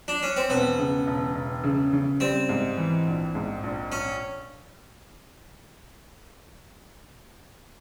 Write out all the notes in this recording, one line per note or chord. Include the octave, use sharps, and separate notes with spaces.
D4
C#4
C4
E1 B3
C#3
E1
E1
C#3
C#3
G3 C4
G#2
E3
A#1
G#2
A#1
C#4